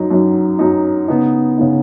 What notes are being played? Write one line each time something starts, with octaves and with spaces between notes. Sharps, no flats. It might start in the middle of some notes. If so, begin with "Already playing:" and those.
Already playing: F#2 F#3 D#4
F#2 F#3 D#4
F#2 F#3 D#4
C#3 B3 D#4
C#3 B3 D#4